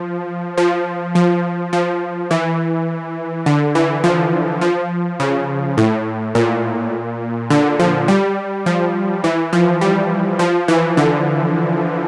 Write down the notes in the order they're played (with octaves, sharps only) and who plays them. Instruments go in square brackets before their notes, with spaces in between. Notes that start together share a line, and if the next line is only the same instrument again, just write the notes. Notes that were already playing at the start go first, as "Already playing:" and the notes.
Already playing: [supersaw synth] F3
F3
F3
F3
E3
D3
E3
F3
F3
C#3
A2
A#2
D3
F3
G3
F3
E3
F3
G3
F3
E3
D3